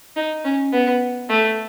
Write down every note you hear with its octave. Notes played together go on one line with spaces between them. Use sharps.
D#4
C#4
B3
A3